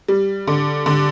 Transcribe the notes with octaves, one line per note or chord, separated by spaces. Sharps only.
G3
D3
D3